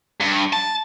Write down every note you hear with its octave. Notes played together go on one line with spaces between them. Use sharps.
G2
A5